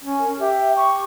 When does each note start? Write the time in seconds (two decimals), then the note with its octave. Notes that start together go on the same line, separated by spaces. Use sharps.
0.05 C#4
0.19 A#4
0.39 G4 E5
0.76 C#6